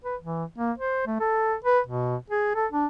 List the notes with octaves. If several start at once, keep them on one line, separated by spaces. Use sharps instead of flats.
B4
E3
A#3
C5
A3
A4
B4
B2
G#4
A4
D4